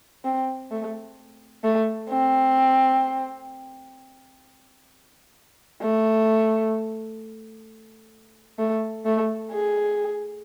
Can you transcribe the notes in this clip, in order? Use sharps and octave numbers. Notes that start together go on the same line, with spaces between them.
C4
A3
A3
C4
A3
A3
A3
G#4